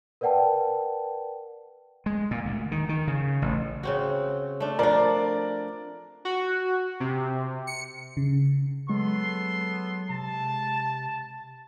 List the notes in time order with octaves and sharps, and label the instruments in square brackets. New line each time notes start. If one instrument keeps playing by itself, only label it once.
[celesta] A#4 B4 D5 F#5 G5 A5
[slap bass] G#3
A#2
D2
D#3
D#3
C#3
A1
[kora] C#3 C4 F#4
A3 D4
[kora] F3 D4 [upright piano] A#4 D5
[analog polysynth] F#4
C3
C#7
[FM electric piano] C#3
[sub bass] F#3 [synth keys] G#3 [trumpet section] B3 A4 C6
[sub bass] C3 [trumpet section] A5